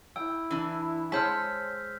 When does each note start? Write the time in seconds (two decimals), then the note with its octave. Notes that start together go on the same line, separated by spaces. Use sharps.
0.16 E4 G5 E6
0.51 E3 D4
1.12 G#3 C5 C#5 F#5 A5 F6 G6 B6